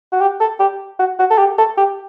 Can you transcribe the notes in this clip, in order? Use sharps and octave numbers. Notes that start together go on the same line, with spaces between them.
F#4
G4
A4
G4
F#4
F#4
A4
G4
A4
G4